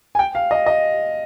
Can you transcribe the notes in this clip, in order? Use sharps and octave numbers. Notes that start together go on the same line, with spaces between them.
G#5
G5
F5
D#5
D#5